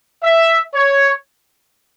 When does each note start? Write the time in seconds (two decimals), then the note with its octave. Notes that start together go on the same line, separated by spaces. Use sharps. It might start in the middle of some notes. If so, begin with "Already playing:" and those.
0.23 E5
0.74 C#5